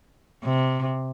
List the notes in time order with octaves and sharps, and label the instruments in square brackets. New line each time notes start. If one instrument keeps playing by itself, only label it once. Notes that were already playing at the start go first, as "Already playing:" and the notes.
[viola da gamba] C3